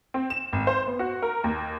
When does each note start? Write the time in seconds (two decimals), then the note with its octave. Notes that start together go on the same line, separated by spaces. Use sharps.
0.14 C4
0.30 E7
0.53 G#1
0.67 C5
0.87 B3
0.99 F#4
1.22 A#4
1.44 D#2